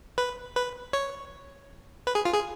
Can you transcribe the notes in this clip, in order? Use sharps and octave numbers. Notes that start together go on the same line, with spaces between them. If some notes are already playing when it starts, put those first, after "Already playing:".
B4
B4
C#5
B4
G#4
F4
G#4